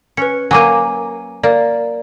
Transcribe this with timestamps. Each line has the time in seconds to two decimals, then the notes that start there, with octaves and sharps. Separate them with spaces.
0.17 C#4 B4 C#7
0.51 F#3 A#3 G#5 D6 D#7
1.43 A#3 D5